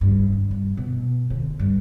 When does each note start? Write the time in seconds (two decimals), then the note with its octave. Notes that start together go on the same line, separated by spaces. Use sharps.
0.01 G2
0.33 D3
0.51 G2
0.77 B2
1.30 D3
1.59 G2